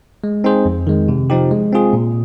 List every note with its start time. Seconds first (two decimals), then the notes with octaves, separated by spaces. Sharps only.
0.24 G#3
0.44 C4 D#4 G#4 C5
0.66 F2
0.87 D#3 G#3
1.08 C3
1.30 F3 C4 D#4 G4
1.51 G#3
1.73 C4 F4 G#4
1.93 A#2